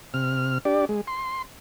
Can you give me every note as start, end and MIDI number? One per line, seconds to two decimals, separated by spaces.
0.14 0.58 48
0.14 0.58 89
0.65 0.85 62
0.65 0.85 67
0.65 0.85 74
0.89 1.01 56
1.07 1.42 84